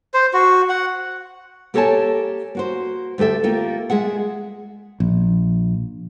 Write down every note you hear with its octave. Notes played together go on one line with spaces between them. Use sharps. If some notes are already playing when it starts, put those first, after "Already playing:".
C5
F#4
F#5
A#3 G4 A4 C#5 G#5 A5
A#3 F#4 C5
D2 A3 G4 A4 E5
A3 A#3 F4 G4
G#3 G#4 E5 F#5
A#1